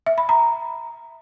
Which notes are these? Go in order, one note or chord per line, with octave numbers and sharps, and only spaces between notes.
E5
B5
A#5